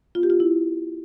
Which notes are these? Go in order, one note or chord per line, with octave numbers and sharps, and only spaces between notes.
B3 F4
G4
F4
E4